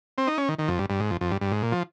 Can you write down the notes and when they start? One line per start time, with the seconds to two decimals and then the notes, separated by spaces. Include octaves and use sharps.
0.18 C4
0.27 D#4
0.38 C#4
0.48 D#3
0.59 D#3
0.68 F2
0.79 G2
0.90 G2
1.00 G#2
1.11 F2
1.21 F2
1.31 G2
1.41 G2
1.52 G#2
1.63 A#2
1.72 F3